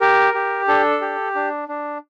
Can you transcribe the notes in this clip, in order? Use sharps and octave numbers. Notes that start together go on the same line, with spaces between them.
G4 A#4
G4
D4 A4
G4
D4
D4